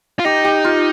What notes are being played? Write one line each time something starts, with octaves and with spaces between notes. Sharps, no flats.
F4
D#4 G4
G4
F4